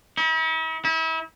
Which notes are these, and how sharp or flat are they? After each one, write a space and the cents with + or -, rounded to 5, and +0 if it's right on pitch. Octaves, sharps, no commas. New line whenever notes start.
E4 -45
E4 -35